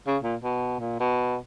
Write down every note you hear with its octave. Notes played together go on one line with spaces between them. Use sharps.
C#3
A#2
B2
A#2
B2